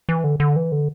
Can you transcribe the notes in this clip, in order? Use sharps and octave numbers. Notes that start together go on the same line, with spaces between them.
E3
D3
D3
E3
D3